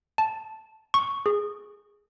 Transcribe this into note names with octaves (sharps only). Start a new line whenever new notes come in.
A5
C#6
G#4